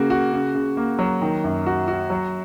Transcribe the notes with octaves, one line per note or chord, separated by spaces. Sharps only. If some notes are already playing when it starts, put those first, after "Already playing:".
Already playing: C#3 A#3 F#4
F#4
C#3
C#3
A#3
F#3
D#3
F#2
F#4
F#4
F#3